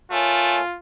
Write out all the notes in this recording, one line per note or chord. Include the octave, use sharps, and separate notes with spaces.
A3 F4 A#4 C#5 G#5